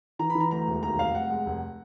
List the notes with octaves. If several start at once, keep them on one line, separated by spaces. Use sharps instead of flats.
E3 A#5
B5
E3
A#5
D2 A#5
E1
D#2 A#5
F1 F5
F1 F#5
G#3
F1